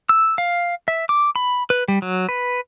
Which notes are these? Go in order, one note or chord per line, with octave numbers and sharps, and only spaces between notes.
E6
F5
E5
D6
B5
B4
G3
F#3
B4